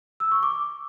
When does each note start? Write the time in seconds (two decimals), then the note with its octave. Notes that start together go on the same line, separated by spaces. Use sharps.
0.20 E6
0.31 C#6
0.43 D6